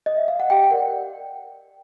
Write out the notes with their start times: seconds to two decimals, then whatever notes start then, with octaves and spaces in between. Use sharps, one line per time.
0.06 D#5
0.17 E5
0.28 F5
0.40 F#5
0.50 G4 G5
0.71 A#4 D5 F#5